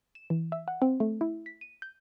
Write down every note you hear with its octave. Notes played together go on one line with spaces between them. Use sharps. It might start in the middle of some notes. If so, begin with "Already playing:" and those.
E7
E3
E5
F#5
C4
A3
E4
B6
D#7
G6